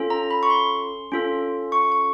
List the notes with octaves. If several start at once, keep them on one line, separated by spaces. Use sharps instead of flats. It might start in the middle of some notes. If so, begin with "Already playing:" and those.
Already playing: C#4 F4 A4
A#5
B5
C#6
C6
C#4 F4 A4
C#6
C#6